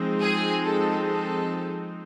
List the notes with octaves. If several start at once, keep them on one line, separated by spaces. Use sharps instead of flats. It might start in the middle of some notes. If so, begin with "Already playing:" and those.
Already playing: F3 G#3 C4 D#4
G#4
A4
A4